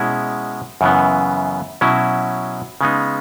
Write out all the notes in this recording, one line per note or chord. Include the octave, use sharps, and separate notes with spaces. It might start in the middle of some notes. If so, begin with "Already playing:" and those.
Already playing: B2 G#3 C#4 E4
F#2 C#3 E3 B3
B2 F#3 C#4 E4
C#3 G#3 B3 D#4